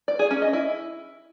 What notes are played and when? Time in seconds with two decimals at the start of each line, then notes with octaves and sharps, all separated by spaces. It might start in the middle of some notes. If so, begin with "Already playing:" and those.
0.08 D5
0.19 G#4
0.31 C#4
0.42 D#5
0.53 E4